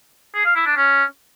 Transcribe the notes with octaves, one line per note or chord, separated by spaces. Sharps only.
G#4
F5
E4
D4
C#4